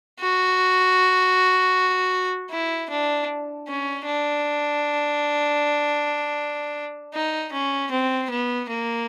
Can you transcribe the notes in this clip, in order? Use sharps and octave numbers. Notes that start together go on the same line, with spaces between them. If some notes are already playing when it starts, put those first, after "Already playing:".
F#4
E4
D4
C#4
D4
D#4
C#4
C4
B3
A#3